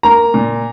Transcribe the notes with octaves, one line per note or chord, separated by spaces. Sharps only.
A#3 A#5
A#2